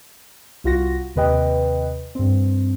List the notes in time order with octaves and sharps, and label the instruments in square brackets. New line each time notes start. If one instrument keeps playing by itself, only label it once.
[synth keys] C2 F4 F#4 A#6
D#2 C3 B4 D#5 G5
G2 C4